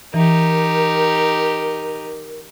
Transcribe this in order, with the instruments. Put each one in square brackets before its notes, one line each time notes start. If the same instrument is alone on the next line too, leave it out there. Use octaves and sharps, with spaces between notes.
[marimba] E3 [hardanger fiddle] D#4 G4 [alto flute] A#4